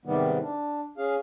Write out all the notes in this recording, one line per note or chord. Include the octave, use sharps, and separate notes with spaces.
G#2 C3 D#3 G3 B3
D4
C#4 G#4 F5